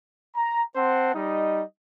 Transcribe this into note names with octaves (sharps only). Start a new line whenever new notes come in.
A#5
C4 C5 F#5 A5
G3 D#4 D#5